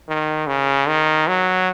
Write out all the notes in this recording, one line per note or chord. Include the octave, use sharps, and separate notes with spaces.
D#3
C#3
D#3
F#3